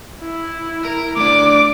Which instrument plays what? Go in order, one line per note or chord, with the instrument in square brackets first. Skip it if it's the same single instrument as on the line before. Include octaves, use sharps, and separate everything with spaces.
[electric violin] E4
[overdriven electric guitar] A#4
[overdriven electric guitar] D2 D4 [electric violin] D6